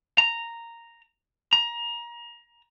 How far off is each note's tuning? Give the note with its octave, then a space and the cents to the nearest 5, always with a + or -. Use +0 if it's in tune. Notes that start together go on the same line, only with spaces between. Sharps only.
A#5 -5
A#5 +25